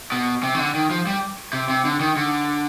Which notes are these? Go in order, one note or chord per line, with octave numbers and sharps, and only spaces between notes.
B2
C3
D#3
D3
D#3
F3
G3
C3
C3
D3
D#3
D3